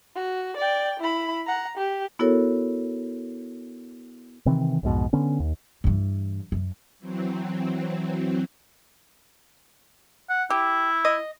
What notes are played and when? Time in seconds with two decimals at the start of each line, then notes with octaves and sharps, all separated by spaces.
0.16 F#4
0.57 D5 G5
1.00 E4 B5
1.47 F#5 A#5
1.77 G4
2.19 B3 E4 F#4 A4 A#4 C#5
4.46 C3 D#3 E3 C4
4.83 B1 F2 G#2 B2
5.13 D3 B3 C#4
5.40 D#2
5.84 G2 E3
6.52 F#2
6.99 E3 F#3 C4
10.29 F#5
10.50 E4 G4
11.05 D#5